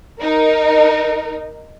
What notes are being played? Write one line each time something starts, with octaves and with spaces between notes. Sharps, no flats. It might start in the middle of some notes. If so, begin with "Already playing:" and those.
D#4 A#4